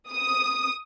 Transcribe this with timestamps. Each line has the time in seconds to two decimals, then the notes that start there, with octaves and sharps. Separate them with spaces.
0.11 D#6